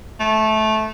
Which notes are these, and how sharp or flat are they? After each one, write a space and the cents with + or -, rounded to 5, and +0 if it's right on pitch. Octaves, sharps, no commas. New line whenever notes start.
A3 -15